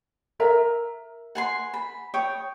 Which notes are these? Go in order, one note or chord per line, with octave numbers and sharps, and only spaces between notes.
A#4 E5 A#5
F#5 G#5 C6
B5
C#5 G5 D#6